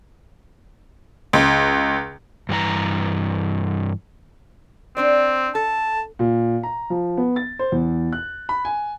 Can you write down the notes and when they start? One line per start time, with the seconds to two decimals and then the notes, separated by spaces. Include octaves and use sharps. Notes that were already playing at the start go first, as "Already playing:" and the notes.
1.33 C#2
2.49 G2 E3 F#4 A#5
4.97 C4 D4 C5 D5
5.55 A4 A5
6.19 A#2
6.63 A#5
6.90 F3
7.17 B3
7.36 A6
7.59 C5
7.72 E2
8.13 F#6
8.49 B5
8.65 G#5